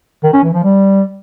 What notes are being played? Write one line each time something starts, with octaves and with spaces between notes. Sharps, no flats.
D#3
C#4
E3
F3
G3